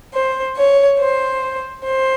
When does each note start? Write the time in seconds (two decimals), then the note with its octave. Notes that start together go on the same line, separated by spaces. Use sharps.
0.14 C5
0.57 C#5
0.99 C5
1.85 C5